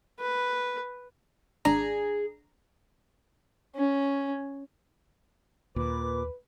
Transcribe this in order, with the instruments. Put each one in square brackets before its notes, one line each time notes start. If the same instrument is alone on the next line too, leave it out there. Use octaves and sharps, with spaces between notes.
[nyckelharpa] B4
[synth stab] G#1 D4 A#5 [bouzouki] G#4
[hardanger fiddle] C#4
[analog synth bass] D#2 [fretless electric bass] A#2 [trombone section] B4 [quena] D6